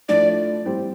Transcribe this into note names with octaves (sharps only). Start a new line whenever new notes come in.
A2 F3 A3 D4 F4 D5
A2 G3 C4 G4 C5